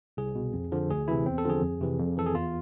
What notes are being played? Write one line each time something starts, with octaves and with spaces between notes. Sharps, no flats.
C2 G#4
B2
F2
D3 F3
D2 G#4
C3 E3 E4
E2 C4
A4
D3 F3 G#4
F2
C3 E3
F2
E3 A4
G#4
E2 F4